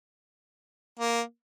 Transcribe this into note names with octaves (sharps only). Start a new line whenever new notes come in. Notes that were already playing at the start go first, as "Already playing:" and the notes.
A#3